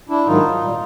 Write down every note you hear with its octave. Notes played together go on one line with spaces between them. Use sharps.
D4 E4
G#2 D#3 F#3 D#4 F4
A#2 G3